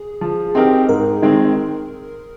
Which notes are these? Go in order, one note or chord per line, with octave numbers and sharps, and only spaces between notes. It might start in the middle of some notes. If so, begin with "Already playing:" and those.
Already playing: G#4
F3
C4 D#4 G4 A#4
G#2 A#4
D#3 G#3 C4